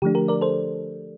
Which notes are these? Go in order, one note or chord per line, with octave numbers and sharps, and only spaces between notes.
D3 F3 A3 D4 G4
G4 A#4
A#4 D5
A4 C5